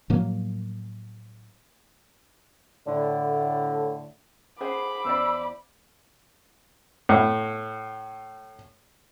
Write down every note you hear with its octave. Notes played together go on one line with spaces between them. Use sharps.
A2 F3 F#3 A#3
A2 D3
G#4 C5 F#5 B5 D6
E2 C5 D5 E6
A2 F#5